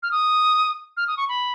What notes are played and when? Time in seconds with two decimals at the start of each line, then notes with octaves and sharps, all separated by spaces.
0.03 F6
0.11 D#6
0.97 F6
1.07 D#6
1.17 C#6
1.29 B5